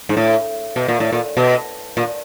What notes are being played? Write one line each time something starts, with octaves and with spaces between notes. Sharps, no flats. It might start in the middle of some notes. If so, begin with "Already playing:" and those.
G#2
A2
B2
A#2
A2
A#2
B2
A#2